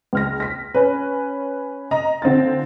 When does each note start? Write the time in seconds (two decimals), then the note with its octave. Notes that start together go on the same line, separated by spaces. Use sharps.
0.13 C#2 F6 A#6
0.40 A#6 B6
0.75 C#4 B4
1.91 D#5 A#5
2.22 D3 C4 F4 A6